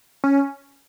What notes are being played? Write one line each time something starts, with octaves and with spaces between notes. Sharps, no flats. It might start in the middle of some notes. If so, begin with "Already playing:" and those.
C#4